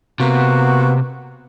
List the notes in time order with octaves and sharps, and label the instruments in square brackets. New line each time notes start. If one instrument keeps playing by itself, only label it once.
[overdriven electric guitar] C3 [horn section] A#3 B3 F#4